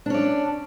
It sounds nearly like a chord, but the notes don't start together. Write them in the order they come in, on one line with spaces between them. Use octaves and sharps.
D4 C#4 D5